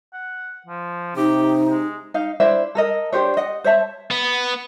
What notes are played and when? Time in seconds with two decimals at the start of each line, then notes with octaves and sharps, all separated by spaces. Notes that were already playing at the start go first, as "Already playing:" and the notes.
0.13 F#5
0.66 F3
1.16 C3 D#4 G4
1.71 G#3
2.14 D#4 F5
2.40 D4 E4 C5 E5
2.75 A4 A#4 D#5
3.13 D4 G4 C5 C#5
3.37 D#5 F#5
3.64 C5 C#5 E5 A5
4.11 B3